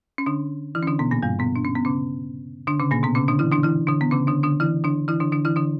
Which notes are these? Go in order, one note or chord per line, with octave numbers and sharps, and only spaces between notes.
C#4
D3 D4
E3 E4
C#4
D3 D4
B2 B3
A#2 A#3
G2 G3
B2 B3
D4
C#4
B3
C#3 C#4
D3 D4
C#3 C#4
A#2 A#3
B2 B3
C#3 C#4
D3 D4
E3 E4
D3 D4
E3 E4
D3 D4
B3
C#3 C#4
D3 D4
D3 D4
E3 E4
D3 D4
E3 E4
D3 D4
D3 D4
E3 E4
D3 D4